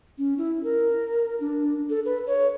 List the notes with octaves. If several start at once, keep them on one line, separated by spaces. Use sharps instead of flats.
C#4
E4
A#4
D4
A4
B4
C#5